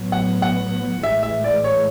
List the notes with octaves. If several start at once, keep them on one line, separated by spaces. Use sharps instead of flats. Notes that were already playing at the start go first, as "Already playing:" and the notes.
Already playing: A2 F#3 B3
F#5
F#5
A2 E3 G#3 E5
E5
D5
C#5